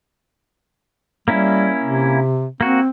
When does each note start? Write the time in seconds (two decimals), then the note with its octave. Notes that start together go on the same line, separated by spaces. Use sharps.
1.28 G3 A#3 C#4 E4
1.83 C3
2.61 A#3 C4 F#4